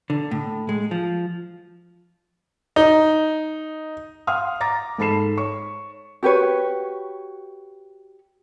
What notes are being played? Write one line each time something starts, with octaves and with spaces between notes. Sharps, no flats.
D3
A2
G#3
F3
D#4
F5 F#5 C6 D#6 F6
A#5 D6 A6 A#6
G#2 A4 A5 B5 C7 E7
C#5 C#6
F#4 G4 B4 C#5